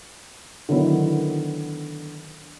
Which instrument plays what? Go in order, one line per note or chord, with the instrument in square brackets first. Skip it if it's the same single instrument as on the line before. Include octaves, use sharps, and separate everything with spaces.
[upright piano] D3 D#3 F#3 B3 E4